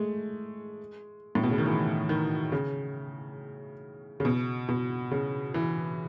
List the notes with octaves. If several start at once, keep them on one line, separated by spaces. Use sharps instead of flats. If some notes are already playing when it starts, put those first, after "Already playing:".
Already playing: G#3 A3
A2
B2
C#3
D#3
E3
D#3
C#3
C#3
B2
B2
C#3
E3